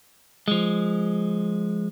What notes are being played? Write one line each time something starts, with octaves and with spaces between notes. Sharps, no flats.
F3 G#3